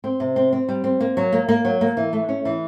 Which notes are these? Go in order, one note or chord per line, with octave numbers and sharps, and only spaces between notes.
C4
C3
C4
C4
G3
C4
A#3
F#3
A#3
A#3
F#3
A#3
E3
A3
C#4
E3